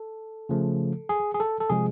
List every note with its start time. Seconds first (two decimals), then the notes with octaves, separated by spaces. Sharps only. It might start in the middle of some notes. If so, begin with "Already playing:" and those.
Already playing: A4
0.49 C#3 F3 A3
1.09 G#4
1.34 G#4
1.40 A4
1.60 A4
1.69 C3 F3 G#3 G#4